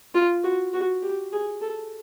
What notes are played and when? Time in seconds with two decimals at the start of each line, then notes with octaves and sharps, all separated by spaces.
0.15 F4
0.44 F#4
0.73 F#4
1.03 G4
1.32 G#4
1.61 A4